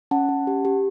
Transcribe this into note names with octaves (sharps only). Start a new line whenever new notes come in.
C#4 F#5 A5
C#4
G4
G4